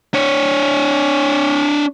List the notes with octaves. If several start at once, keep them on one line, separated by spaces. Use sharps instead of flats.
D4 C#5